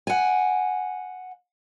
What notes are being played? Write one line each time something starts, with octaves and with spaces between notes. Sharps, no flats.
F#5 G#5